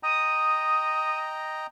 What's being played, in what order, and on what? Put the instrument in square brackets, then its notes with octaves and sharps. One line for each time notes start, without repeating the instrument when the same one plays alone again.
[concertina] D#5 G5 A#5 [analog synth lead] D#6